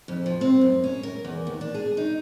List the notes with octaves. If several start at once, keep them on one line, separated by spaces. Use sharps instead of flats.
F2
F3
C4
F#2
C#4
A#4
E2
D#2
D4
G#4
D#4